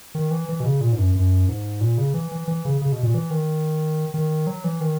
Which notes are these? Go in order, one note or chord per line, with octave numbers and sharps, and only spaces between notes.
D#3
E3
E3
B2
C#3
A#2
G#2
F#2
F#2
G#2
A#2
C#3
E3
E3
E3
C#3
C#3
B2
A#2
E3
D#3
D#3
F#3
E3
D#3